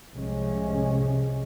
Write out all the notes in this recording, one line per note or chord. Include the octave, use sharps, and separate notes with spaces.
C2 C3 F3 G#3 C#4